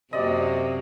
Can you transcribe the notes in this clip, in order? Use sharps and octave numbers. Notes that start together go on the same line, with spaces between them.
F#2 C3 F#3 A#3 D5 D#5